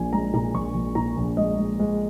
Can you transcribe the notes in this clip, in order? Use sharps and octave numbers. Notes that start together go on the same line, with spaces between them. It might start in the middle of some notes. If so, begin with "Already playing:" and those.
Already playing: A#1 A#2 G#5
G#3 A#5
A#2 A#5
A#1 C#6
A#1
A#2 A#5
A#1
G#3 D#5
G#3
G#3